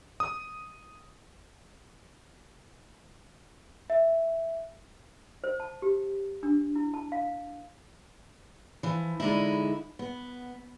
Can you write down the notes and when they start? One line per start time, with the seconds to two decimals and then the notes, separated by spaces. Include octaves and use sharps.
0.20 D#6
3.90 E5
5.44 C5
5.60 A5
5.82 G4
6.43 D4
6.76 E4
6.94 A5
7.12 F5
8.83 E3 F3
9.20 D3 G#3 D#4 E4
9.99 B3